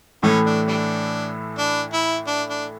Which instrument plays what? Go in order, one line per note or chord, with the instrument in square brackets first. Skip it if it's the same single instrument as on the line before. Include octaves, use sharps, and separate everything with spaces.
[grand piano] A2 E3 A3 [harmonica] C#4
[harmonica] D4
G3 D4
D4
E4
D4
D4